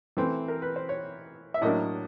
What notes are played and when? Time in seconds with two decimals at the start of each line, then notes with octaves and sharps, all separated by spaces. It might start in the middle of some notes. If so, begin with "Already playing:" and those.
0.17 E3 A3 C4
0.48 A#4
0.62 B4
0.76 C5
0.89 C#5
1.54 E5
1.62 A2 F#3 A#3 D4 D#5